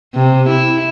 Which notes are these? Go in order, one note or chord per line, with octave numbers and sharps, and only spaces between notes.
C3
E4